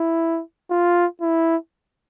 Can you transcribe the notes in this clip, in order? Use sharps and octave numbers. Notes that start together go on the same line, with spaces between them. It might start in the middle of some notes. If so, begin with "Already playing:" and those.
Already playing: E4
F4
E4